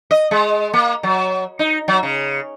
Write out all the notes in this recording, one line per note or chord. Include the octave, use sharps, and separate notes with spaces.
D#5
G#3
A#3
F#3
D#4
F#3
C#3